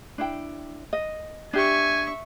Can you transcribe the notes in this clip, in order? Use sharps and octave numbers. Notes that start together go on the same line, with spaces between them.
D4 E4 G5
D#5
D4 G4 E5 G#5 C#6